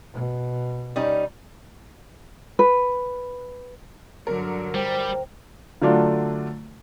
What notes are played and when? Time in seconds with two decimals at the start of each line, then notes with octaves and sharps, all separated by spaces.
0.13 B2
0.96 G3 C#4 D#4
2.59 B4
4.27 G2 D3 F#3 A#4
4.74 G3 C5 G5
5.82 D3 F#3 A3 D4 F4